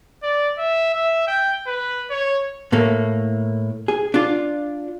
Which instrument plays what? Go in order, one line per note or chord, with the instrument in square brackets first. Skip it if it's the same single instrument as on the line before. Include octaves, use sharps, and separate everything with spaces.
[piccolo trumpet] D5
E5
E5
G5
B4
C#5
[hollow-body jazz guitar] A2 A3 A#3
G#4
D4 F4